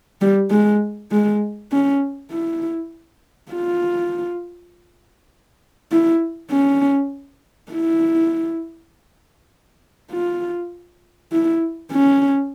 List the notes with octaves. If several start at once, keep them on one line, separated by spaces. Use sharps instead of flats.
G3
G#3
G#3
C#4
E4
F4
E4
C#4
E4
F4
E4
C#4